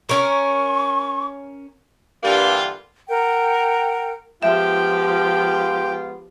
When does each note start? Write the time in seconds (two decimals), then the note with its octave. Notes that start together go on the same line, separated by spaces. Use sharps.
0.09 C#4 A#4 C#6
2.23 G2 D3 E3 G3 A#3 F4
3.08 A#4 F#5 G5
4.43 F3 G#3 B3 F4 G4 E5 G5